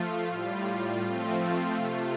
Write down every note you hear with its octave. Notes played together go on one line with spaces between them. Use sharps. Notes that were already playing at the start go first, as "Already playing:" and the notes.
Already playing: F3 A3 F4
A2 G3 F4
F3 A3 C4 F4
C3 A3 F4